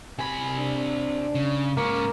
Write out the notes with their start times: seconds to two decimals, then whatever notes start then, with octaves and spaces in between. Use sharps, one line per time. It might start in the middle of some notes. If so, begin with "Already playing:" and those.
0.19 C3 G#5 B5
0.59 D4
1.35 C#3
1.77 G#2 A#3 C#4